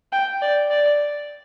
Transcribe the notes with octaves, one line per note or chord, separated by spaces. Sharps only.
G5
D5
D5